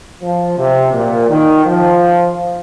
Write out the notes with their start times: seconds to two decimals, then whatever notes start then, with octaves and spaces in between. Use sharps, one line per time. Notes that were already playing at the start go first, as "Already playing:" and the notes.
0.22 F3
0.58 C3
0.93 A#2
1.29 D#3
1.65 F3